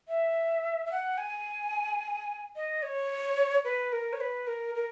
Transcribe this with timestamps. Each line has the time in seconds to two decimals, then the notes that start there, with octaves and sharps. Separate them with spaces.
0.08 E5
0.86 E5
0.92 F#5
1.18 G#5
2.56 D#5
2.83 C#5
3.65 B4
3.92 A#4
4.13 C#5
4.21 B4
4.47 A#4
4.75 A#4